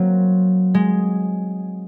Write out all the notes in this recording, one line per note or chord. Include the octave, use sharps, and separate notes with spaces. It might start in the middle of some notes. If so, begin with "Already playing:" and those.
Already playing: F#3 A#3 C4
G#3